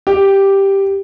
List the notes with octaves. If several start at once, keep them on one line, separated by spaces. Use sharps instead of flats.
G4